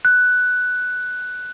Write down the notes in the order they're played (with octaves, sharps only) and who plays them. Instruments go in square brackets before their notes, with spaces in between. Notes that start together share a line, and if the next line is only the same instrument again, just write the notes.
[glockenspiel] F#6